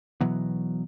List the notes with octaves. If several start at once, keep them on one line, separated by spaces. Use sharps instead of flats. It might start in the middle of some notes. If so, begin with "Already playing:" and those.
B2 E3 F#3 B3